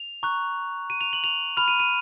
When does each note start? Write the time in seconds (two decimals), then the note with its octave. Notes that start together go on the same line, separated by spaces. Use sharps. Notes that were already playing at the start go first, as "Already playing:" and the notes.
Already playing: F7
0.23 A#5 C#6 F#6
0.90 D#7
1.01 F7
1.13 F#7
1.24 F7
1.57 B5 F6 F7
1.68 D#7
1.80 D#7